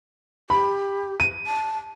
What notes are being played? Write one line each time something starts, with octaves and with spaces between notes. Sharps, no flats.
G4 B5
D#7
A5